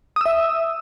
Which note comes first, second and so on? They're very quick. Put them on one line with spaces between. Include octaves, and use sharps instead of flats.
D#6 E6 E5